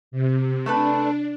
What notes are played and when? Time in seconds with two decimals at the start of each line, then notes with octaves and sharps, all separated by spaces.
0.11 C3
0.66 A3 D4 A4 B4